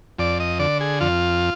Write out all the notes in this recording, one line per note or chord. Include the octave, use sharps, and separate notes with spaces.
F2 D5
D#5
D3 D5
G#4
F2 F4